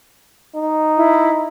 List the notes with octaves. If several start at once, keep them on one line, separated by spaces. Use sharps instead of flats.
D#4
E4